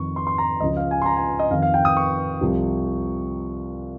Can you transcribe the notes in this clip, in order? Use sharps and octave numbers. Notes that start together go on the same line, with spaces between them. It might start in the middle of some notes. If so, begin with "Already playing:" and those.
Already playing: F2 D#3 C#6
C6
C6
A#5
C#2 C#3 F3 D#5
F5
G#5
C6
A#5
G#5
D#5
F2 D#3 F5
F5
G5
D#6
C#6
C2 C3 F3